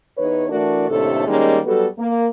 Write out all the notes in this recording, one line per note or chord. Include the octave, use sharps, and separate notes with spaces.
E2 D#4 B4 C#5
E3 A3 D4 F#4 A#4 D5
D#2 A2 C3 A3 D4 A4
D#3 G3 G#3 A#3 C#4 D#4
F#3 G3 B3 F#4 A4
A#3